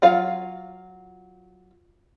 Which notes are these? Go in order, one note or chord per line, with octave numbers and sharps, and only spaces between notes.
F#3 F4 F5